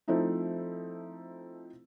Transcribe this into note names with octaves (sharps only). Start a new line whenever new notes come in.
F3 A3 C4 D#4 E4